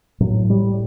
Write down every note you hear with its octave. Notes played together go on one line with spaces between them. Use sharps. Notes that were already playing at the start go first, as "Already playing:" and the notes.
A2 F#3
G3